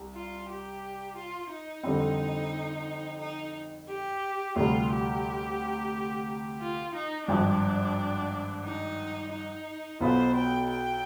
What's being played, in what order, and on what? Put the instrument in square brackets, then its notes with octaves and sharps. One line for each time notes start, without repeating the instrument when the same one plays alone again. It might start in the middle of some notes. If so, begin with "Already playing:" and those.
Already playing: [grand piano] C2
[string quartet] F4
G4
F4
D#4
[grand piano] F2 D3 G3 C4
[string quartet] D#4
G4
[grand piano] D2 C3 G3 [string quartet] F4
[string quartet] G4
F4
D#4
[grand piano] G#1 G2 F3 [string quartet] D4
[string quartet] D#4
D#4
[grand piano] B1 B2 B3 F4 B4 [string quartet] C5
[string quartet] G5
G5